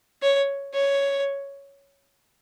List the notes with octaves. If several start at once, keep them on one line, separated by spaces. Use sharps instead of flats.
C#5
C#5